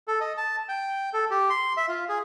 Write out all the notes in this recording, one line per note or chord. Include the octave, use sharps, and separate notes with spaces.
A4
D#5
A5
G5
A4
G4
C6
E5
F4
G#4